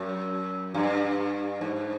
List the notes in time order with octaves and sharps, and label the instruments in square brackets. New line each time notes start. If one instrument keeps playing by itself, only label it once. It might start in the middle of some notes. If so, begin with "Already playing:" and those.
Already playing: [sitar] F#2
G2
G#2